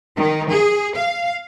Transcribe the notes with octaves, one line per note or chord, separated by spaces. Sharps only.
D#3
G#4
F5